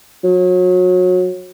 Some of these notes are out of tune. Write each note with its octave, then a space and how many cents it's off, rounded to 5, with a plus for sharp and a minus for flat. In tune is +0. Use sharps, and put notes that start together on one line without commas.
F#3 -30